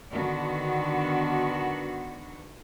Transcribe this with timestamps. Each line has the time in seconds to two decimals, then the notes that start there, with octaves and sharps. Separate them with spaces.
0.12 D3 D#3 B3 D4 F#4